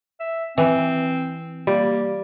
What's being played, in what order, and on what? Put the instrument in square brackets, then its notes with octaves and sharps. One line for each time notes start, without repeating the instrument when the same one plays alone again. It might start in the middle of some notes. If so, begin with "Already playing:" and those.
[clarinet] E5
[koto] E3 [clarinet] C4
[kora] G3 [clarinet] A#3